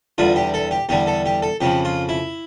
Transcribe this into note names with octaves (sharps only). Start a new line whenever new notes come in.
E2 D3 G3 F4
G4
A4
G4
E2 D3 G3 G4
A4
G4
A4
F2 C#3 F3 G4
F4
E4